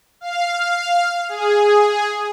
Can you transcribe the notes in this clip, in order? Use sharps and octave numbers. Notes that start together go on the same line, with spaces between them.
F5
G#4